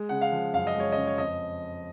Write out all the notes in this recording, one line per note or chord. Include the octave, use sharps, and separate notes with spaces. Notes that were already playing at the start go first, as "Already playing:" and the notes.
Already playing: G#3
C#3 F#5
F5
F3
F#2 F5
D#5
G#3 C#5
D#5
C#3
C#5
F2 D#5